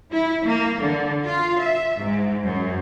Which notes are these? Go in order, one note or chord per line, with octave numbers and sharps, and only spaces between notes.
E4
A#3
D3
F4
E5
G#2
F#2